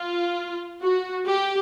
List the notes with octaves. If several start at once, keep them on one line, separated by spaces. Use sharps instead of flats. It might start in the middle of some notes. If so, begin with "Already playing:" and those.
Already playing: F4
F#4
G4